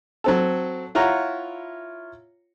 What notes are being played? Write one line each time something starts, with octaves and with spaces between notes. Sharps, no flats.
F#3 C4 A4
E4 F4 C#5 F#5 A#5